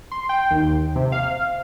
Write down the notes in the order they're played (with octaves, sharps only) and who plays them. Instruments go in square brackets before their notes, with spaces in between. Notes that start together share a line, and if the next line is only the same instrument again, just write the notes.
[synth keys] C6
G5
D#2
C3
F5